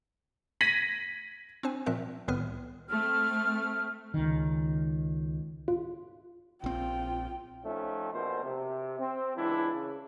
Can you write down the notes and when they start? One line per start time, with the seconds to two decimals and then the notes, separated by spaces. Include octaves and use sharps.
0.61 G#6 A#6 B6 D#7 F#7
1.63 C4 D4 C5 G#5
1.86 A#2 F3 C4 A#4 E5 F#6
2.28 C2 A2 D#3 B3 B4 F6
2.89 A3 C4 F6
4.14 C#2 D#3
5.68 F4
6.64 A#1 C4 F4 G5
7.63 F3 A3 C4 C#4 D#4
8.13 A#1 B2 A#4 C5
8.43 C3
8.99 C4
9.36 C#2 E3 D4 E4
9.73 C#3